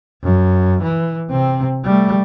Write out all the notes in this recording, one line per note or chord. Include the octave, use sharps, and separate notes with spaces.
F#2
E3
C3 C4
G3 A3